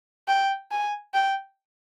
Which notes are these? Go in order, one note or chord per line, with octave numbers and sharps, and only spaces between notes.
G5
G#5
G5